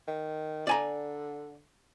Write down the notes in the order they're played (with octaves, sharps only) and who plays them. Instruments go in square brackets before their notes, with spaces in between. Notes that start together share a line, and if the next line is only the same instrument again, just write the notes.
[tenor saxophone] D#3
[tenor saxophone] D3 [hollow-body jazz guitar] D5 G#5 A#5